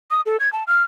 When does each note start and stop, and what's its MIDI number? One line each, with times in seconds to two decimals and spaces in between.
0.11 0.21 87
0.26 0.37 69
0.40 0.52 92
0.53 0.64 81
0.67 0.83 89